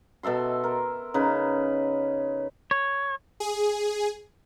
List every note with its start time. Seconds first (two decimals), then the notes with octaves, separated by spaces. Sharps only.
0.23 B2 A4 E5 C6
0.64 A#4
1.14 C#3 D#4 B4
2.71 C#5
3.40 G#4